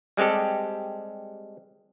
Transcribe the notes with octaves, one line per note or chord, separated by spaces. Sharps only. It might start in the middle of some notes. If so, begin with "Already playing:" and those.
G3 G#3 C4 G4 A4